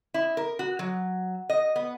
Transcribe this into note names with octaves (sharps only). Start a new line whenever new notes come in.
E4
A#4
F#4
F#3
D#5
B3